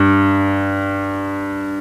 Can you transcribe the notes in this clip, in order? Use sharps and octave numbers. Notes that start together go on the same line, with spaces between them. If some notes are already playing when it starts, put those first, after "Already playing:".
Already playing: G2